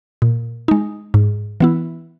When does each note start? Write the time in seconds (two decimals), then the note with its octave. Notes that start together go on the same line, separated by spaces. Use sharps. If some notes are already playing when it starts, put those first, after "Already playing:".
0.22 A#2
0.68 G#3 D#4
1.14 G#2
1.60 E3 B3 E4